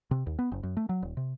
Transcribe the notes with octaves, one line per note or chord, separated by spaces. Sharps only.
C3
D#2
B3
F#1
F#2
A3
F#3
D#1
C3